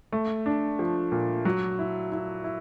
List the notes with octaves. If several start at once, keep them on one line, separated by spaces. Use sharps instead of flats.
A3
D4
F3
A#2
F#3
E4
E4
E4